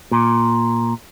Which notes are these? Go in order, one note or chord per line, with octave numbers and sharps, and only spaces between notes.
A#2